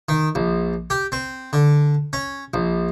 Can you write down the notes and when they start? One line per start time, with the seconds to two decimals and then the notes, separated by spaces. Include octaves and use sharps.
0.09 D#3
0.35 A#1
0.90 G4
1.12 C4
1.53 D3
2.13 C#4
2.54 A#1